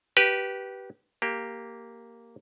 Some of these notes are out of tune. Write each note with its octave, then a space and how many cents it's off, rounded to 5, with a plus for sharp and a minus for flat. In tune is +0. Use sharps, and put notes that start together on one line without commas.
G4 -20 B4 -15
A#3 -5 G4 +0